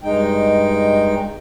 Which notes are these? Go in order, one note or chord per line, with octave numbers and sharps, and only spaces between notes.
G2 G#3 D#4 G5